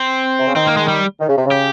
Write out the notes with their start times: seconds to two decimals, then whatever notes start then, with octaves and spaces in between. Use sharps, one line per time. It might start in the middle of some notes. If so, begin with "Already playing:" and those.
Already playing: C4
0.39 C3
0.47 C#3
0.56 D#3 C4
0.67 A#3
0.77 G#3
0.88 G3
1.20 D#3
1.28 C#3
1.37 C3
1.46 C#3
1.51 G4